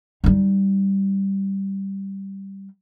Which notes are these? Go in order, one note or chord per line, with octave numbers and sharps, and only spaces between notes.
G3 D#4